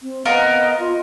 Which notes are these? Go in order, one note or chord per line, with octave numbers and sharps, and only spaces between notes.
C4
B3 A#4 D#5 F5
F4